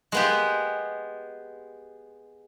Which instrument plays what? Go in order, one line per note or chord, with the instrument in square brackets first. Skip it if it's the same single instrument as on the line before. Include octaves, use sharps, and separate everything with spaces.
[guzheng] G#3 B3 G4